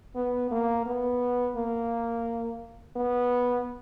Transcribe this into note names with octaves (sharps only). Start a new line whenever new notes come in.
B3
A#3
B3
A#3
B3